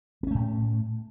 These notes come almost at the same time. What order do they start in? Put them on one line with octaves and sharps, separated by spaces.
B3 C#4 A3 A2